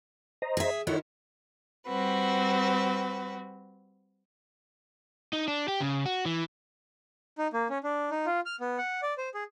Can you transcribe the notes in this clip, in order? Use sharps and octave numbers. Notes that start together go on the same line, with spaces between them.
C5 D#5 A#5
G#4 E5
D#3 E4 F4 A4 C#5 F#5
G3 C4 F#4 B4
D#4
D4
G4
C#3
F#4
E3
D#4
A#3
C#4
D4
D#4
F4
F6
B3
F#5
D5
C5
G#4